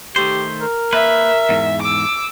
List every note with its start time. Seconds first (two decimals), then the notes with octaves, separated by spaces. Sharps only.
0.16 D#3 A3 G4 C5
0.61 A#4
0.93 A#3 B4 E5
1.49 E2 G#2
1.82 D6 E6